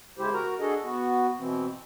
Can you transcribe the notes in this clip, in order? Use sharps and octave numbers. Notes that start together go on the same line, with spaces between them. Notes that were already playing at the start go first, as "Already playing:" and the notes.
E2 C#3 G#3 E4 G4 C5
F#4 A#4 A#5
D4 F#4 G#4 A4 D#5
B3 F#4
B2 E3 C4